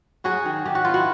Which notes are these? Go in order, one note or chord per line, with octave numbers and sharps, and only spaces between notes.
F#3 F#4 G#4
D#3
D#3 G4
F#4
B3 F4
E4 F#4